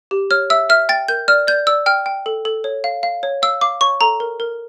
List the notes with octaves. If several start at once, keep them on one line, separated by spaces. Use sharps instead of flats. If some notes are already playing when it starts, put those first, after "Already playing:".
G4
C#5 F6
E5 E6
E5 F6
G5 A6
A#4 G6
D5 F6
D5 G6
D5 E6
G5 F6
G5
A4
A4
C#5
F5
F5
C#5
F5 E6
F5 D6
C#5 C#6
A4 A#5
A#4
A#4